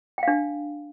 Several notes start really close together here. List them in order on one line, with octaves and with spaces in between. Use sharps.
G5 F5 D4